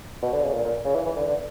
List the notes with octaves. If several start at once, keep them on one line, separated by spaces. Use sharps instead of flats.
B2
D3
C#3
A#2
A#2
C#3
E3
E3
D3
D3